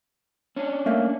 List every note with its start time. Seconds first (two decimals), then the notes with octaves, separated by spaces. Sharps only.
0.56 C#4 D4
0.86 A3 A#3 E5